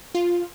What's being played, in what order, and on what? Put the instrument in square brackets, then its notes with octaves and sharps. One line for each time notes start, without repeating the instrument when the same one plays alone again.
[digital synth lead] F4